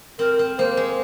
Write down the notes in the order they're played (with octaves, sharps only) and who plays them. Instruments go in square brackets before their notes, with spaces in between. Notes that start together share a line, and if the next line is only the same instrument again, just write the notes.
[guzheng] C4 [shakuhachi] A#4
[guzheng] C4
[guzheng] A#3 [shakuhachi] C5
[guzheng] G#3